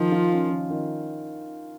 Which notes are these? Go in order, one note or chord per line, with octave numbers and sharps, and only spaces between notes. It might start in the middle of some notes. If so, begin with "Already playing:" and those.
Already playing: D#3 F3
F4
C#4
D#3
D#3